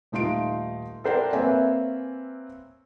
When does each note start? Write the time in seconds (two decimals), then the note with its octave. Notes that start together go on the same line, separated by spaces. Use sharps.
0.12 D#1 A3 D#4 F4 C6 D7
1.04 A4 A#4 C5 D5 F#5 G5
1.33 A#3 C4 B4 C#5 E5 G#5